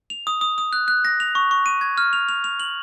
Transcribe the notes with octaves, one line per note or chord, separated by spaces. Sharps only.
F7
D#6
D#6
D#6
F#6
F#6
A#6
F7
C#6
C#6
D#7
G#6
F6
F7
F7
F7
F#7